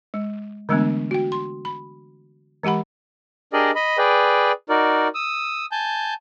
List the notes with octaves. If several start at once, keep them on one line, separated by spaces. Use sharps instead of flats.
G#3
D3 E3 G#3 A3 B3 D4
F#4 G5
C6
B5
E3 G#3 G4 F#5 B5
D4 G4 G#4 A#4 D5 D#5
D#5 B5
G#4 B4 D5 G5
D#4 F#4 A#4 D5
D#6 E6
G#5 A5 G6